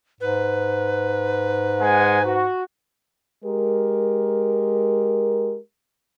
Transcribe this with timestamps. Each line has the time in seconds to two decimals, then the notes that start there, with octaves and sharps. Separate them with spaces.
0.21 G#2 B4
1.80 G#3 F#5 G#5
2.25 F#4
3.45 G#3 G4 A#4